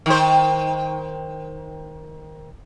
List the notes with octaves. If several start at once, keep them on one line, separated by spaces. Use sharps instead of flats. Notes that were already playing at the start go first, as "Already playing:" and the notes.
D#3 C5